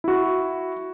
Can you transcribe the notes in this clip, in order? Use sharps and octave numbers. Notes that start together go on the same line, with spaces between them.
E4 F#4